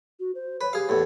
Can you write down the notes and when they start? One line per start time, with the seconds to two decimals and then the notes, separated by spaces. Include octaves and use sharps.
0.20 F#4
0.35 C5
0.61 B4 C#5
0.73 G4 G#4 F5
0.89 E2 A2 G4